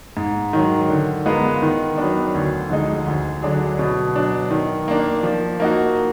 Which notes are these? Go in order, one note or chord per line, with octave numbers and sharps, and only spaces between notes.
G#2
D#3 F#3
D3
G#3 B3 F4 A#4
D#3
F#3 B3 D4
D2
D3 F3 G#3 D#4
D2
D3 F#3 D4 G#4
B2
F#3 D4
D#3
A#3 D4
F3
A#3 D#4 F#4